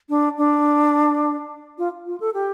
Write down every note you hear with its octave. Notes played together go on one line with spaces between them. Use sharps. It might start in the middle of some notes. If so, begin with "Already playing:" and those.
D4
D4
F4
F4
A4
G4